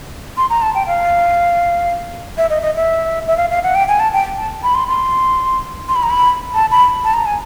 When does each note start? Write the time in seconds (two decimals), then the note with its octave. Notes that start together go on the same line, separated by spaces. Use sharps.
0.37 C6
0.50 A#5
0.62 A5
0.75 G5
0.87 F5
2.38 E5
2.50 D#5
2.62 D#5
2.76 E5
3.28 E5
3.37 F5
3.51 F5
3.63 F#5
3.75 G5
3.88 G#5
4.00 A5
4.13 G5
4.38 A5
4.63 B5
4.75 C6
4.88 C6
5.88 C6
5.95 B5
6.03 A#5
6.10 B5
6.54 A5
6.71 B5
7.04 A5
7.14 A#5
7.26 G#5